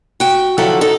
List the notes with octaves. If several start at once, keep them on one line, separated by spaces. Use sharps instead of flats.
F#4 G5
D3 F3 F#3 E4 A4 F#5
D#4 A4